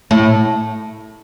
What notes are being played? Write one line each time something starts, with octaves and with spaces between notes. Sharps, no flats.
A2